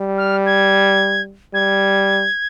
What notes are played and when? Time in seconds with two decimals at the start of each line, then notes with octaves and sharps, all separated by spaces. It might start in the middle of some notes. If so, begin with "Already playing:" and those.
Already playing: G3
0.18 F6
0.46 G#6
1.53 G3 G#6